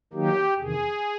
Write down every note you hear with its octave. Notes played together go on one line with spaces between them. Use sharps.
D#3 F#3 A#3 D#4 G4
E2 C3 D#3 G#4